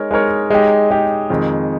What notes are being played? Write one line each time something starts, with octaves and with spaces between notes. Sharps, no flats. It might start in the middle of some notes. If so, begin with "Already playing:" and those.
Already playing: G#3 D#4 A#4 C#5
G#3 D#4 A#4 C#5
G#3 D#4 G4
G#3 D#4 G4
F2 D#3 G#3